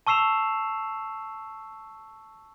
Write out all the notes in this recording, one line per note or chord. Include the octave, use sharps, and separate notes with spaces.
A5 C#6 E6 C7 E7 F7